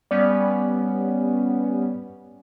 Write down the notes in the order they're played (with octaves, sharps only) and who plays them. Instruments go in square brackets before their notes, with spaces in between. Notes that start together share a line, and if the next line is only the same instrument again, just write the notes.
[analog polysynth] G3 B3 C#4 [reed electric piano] D5